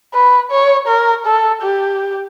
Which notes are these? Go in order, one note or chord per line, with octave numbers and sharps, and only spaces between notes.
B4
C#5
A#4
A4
G4